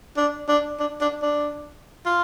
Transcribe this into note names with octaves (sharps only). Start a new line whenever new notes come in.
D4
D4
D4
D4
D4
F4